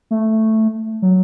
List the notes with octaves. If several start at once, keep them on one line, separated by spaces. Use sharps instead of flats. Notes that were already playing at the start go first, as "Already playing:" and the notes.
A3
F#3